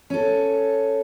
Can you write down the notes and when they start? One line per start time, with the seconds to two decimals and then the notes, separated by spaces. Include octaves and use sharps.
0.10 C#4 A4